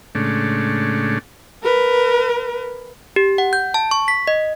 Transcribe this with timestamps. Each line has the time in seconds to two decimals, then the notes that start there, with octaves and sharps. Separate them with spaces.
0.15 A2 C#3 G#3 A3 D4
1.64 A#4 B4
3.16 G4
3.38 F#5
3.53 G6
3.74 A5
3.91 C#6
4.08 B6
4.27 D#5